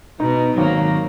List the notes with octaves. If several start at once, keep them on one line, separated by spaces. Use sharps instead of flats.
B2 D#4
G#1 F#3 A#3